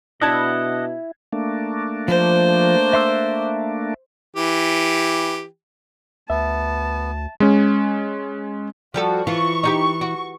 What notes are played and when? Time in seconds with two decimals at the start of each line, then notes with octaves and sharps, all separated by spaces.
0.21 B2 D4 E4 D#5 F#5 A5 G#6
1.33 A3 A#3 D4
2.08 F3 C5
2.93 E5 C6 E6
4.36 E3 G4
6.30 D2 B3 E5 A5
7.40 G#3 C#4
8.94 F3 G3 F#4 A4
9.27 E3 F4 C#6
9.63 D#4 F4 G4
10.01 F#4